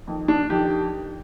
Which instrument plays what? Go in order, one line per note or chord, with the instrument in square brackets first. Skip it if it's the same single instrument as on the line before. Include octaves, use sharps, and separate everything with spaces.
[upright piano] F2 D#3
D4
F2 D#3 G4